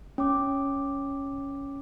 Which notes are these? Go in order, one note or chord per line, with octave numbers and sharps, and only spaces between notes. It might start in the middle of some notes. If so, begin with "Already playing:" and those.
C#4 D6